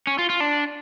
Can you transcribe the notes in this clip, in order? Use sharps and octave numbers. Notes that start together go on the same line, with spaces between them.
C#4
F4
F4
D4